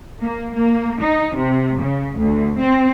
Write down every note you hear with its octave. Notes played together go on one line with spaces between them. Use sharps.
A#3
A#3
D#4
C3
C#3
D2
C4